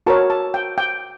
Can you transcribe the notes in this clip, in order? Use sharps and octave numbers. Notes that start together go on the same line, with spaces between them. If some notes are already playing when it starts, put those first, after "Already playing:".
F#4 A#4 C#5 A5
A5
G5
G5